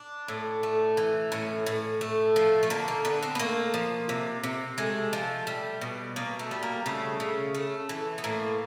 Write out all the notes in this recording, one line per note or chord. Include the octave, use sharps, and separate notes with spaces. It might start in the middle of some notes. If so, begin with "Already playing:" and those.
Already playing: D4
A2
A3
E3
A2 C#4
A2
A3
F3
A3
D3 A#3
A#3
D3 B3
C4
B3
A3 A#3
F3
C3
C3
G#3 A3
F3
G3
B2
B2 A#3
A3
G3
A#3
C#3 A3
C#3
A3
E3
B3
A2 A#3